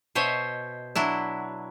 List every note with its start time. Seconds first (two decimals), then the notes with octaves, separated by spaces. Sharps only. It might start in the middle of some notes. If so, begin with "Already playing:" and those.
0.15 B2 C5 C#5 D#5 E5
0.95 F#3 D4 E4